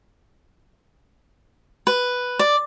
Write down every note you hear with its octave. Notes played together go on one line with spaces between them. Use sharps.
B4
D5